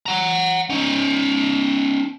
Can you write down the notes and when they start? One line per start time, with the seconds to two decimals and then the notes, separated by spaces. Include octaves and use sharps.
0.06 F#5 A#5
0.70 C#4 D#4